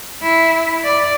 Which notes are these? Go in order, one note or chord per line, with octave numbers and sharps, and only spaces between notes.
E4
D5